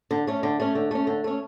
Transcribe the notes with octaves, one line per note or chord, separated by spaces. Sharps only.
D3
A3 C#4
D3
A3 C#4
D3
A3 C#4
D3
A3 C#4